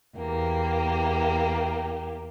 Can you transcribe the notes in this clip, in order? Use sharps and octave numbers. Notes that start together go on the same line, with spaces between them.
E2 A#3 G4